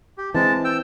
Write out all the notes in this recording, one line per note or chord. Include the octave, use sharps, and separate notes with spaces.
G4
E3 G#3 C4 A5
G5 E6